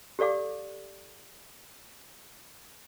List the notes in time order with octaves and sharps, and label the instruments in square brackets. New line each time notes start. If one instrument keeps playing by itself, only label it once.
[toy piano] G4 A4 D5 F5 D6